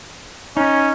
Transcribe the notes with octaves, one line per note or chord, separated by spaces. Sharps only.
C#4 D#4